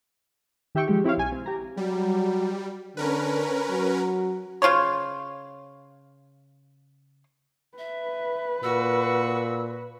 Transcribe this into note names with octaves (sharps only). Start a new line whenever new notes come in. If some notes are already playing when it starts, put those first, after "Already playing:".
D#3 G4 E5 G5 C#6
F3 G#3 G4
C4 E4 G4 C#5 F5
B1 G#5
C4
G4 A#5
F#3 G3
D3 C#4 A#4 B4
F#3
C#3 F4 C5 C#5
B4 E5
A#2 F#4 E6